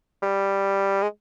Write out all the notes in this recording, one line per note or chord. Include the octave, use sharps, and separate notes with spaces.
G3
G#3